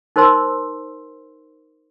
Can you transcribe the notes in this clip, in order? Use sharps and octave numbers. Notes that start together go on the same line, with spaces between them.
D#4 A#4 C5 C6 E6